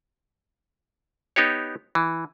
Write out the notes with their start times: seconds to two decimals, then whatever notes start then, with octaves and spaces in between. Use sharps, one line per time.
1.36 B3 D#4 G4 C#5
1.95 E3